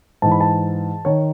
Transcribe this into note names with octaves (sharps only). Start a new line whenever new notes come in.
G#2 E3 A5
B5
A5
D#3 C#5